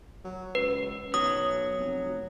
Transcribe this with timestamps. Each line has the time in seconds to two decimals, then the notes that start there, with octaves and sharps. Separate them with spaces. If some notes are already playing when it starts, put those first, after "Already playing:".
0.25 F#3
0.55 C#2 B4
1.14 B1 F#3 D#6
1.79 F1